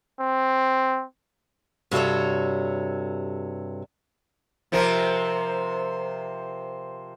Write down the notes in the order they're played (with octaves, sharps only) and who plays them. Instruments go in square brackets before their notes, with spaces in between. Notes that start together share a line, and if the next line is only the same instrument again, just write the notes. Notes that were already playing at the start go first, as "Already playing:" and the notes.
[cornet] C4
[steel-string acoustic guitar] G2 C3 F#4 A4 C#5
[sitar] C3 F3 A#4